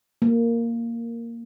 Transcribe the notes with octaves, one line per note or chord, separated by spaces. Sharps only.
A#3